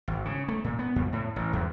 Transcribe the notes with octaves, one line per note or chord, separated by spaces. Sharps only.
G#1
C#3
A3
A#2
B3
F2
A2
A1
E2